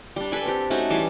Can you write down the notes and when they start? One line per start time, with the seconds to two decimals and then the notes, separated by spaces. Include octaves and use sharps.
0.16 G3 D4
0.32 A4 B4 G5 G#5
0.45 C4 G4
0.70 A3 C#4 D#4 F#4
0.90 E3 G3 G#5 A5